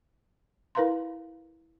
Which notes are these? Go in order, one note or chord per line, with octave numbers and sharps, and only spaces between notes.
E4 A#4 B4 F5 A#5 C6